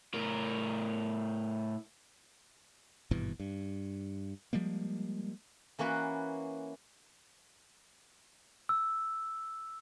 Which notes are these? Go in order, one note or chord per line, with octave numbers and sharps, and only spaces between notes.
A2 A#4
G#1 G2 B2 E3
G2
F3 G3 G#3 A#3
E3 A#3 C#4 F#4 B4
E6